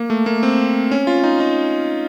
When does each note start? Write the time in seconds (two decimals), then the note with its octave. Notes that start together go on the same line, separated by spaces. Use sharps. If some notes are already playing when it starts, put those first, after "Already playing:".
Already playing: A#3
0.10 A3
0.26 A#3
0.43 C4
0.91 C#4
1.07 F4
1.24 D#4
1.40 D#4